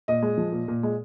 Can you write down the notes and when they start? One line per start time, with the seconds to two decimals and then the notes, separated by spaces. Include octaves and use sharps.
0.08 A#2 D#5
0.22 G#3
0.38 F3
0.52 A#2
0.68 A#2
0.83 G#3